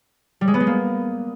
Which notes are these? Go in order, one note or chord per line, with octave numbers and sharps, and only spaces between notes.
G3
G#3
B3
G#3
A#3